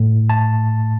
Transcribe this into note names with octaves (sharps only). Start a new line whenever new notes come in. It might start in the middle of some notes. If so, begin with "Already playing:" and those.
Already playing: A2 A3
A5